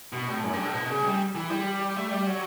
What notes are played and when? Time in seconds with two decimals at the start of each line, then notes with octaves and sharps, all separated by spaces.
0.13 B2
0.28 A2
0.44 F#2
0.53 G2
0.64 A2
0.74 B2
0.90 C#3
0.99 A3
1.04 G3
1.35 E3
1.50 G3
1.97 A3
2.11 G3
2.27 F#3